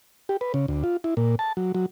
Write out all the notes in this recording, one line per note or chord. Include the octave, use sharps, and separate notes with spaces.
G4
B4
C#3
D2
F4
E4
A#2
A5
F#3
F#3